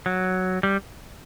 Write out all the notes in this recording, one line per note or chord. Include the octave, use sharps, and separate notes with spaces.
F#3
G3